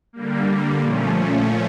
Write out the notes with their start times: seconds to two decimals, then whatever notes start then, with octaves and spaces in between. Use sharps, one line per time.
0.13 D3 G3 A#3
0.80 A#2 F3 A3 C#4